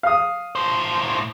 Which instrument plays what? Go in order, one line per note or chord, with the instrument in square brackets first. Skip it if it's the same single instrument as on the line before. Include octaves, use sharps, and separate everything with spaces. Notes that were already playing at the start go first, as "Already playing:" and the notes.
[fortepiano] F5 D#6
[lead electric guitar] A2 C5